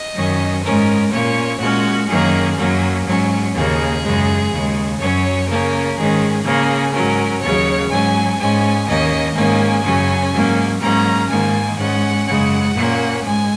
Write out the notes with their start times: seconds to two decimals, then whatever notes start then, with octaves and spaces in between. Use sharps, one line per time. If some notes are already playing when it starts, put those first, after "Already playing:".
Already playing: D#5
0.15 F#2 D#3 F#3 C#4
0.63 G#2 G#3 C#4 A#4
1.12 A#2 A#3 C#4 C#5
1.60 A#2 G#3 C#4 F#4
2.08 F#2 D#3 F#3 A#3 C#4 G#4
2.57 F#2 F#3 A#3 C#4
3.06 G#2 F#3 C#4
3.54 D#2 C#3 A#3 C#4 G#4
4.03 F#2 C#3 G#3
4.52 D#2 C#3 G#3
5.00 F#2 F#3 C#4 C#5
5.48 C#3 A#3 C#4 A#4
5.97 G#2 D#3 G#3 C#4 G#4
6.45 C#3 A#3 C#4 G#4
6.93 G#2 F#3 C#4 A#4
7.42 D#2 C#3 F#3 C#5
7.90 G#2 F#3 C#4 G#5
8.39 G#2 G#3 C#4 G#5
8.87 D#2 D#3 A#3 C#4 D#5
9.36 G#2 D#3 A#3 C#4 G#5
9.84 F#2 C#3 F#3 C#4
10.33 G#2 F#3 A#3 C#4
10.81 G#2 F#3 A#3 C#4 A#5
11.30 G#2 D#3 A#3 G#5
11.78 G#2 G#3 C#4 F#5
12.26 F#2 C#3 G#3 F#5
12.75 A#2 A#3 C#4
13.24 G#2 G#3 G#5